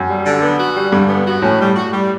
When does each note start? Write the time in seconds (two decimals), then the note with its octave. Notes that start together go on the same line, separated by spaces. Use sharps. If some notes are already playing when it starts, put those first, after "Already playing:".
Already playing: F#2
0.08 G3
0.26 D3
0.42 B3
0.59 F#4
0.76 G3
0.92 G2 D3
1.09 B3
1.26 F#4
1.42 A2 C#4
1.59 G3
1.75 F#4
1.92 G3